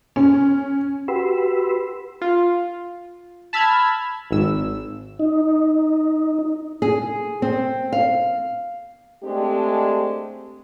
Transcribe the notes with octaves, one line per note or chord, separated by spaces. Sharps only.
C#4
F#4 G4 B4 B5 C6 E6
F4
A5 B5 E6 F6 G#6
G#1 E6
D#4
G#4
C4
F5
G#3 A3 C4 D4 G4